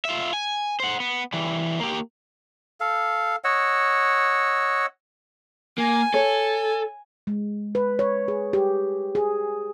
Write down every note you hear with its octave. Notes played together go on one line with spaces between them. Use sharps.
F4 E5
G#5
C5 F#5
B3
E3 G3
A#3 G4
A4 F5
C#5 D#5 F#5 E6
A#3 G#5
A4 C#5
G#3
B4
C#5
G#4
G4
G#4